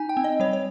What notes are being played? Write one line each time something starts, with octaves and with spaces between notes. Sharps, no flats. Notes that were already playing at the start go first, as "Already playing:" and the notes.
Already playing: D#4 G#5
G5
C4
D#5
G3 C#5
C#5